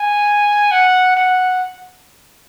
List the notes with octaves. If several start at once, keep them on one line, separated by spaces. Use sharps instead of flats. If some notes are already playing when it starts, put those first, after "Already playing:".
Already playing: G#5
F#5
F#5